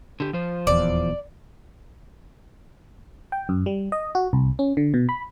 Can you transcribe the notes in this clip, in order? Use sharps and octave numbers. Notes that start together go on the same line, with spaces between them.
D3 G4
F3 C5
D#1 E2 D5
G5
F#2
G3
D#5
F#4
C2
C#4
D3
B2
B5